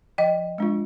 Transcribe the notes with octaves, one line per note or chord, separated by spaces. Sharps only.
F3 D#5 G5
G#3 D4 F4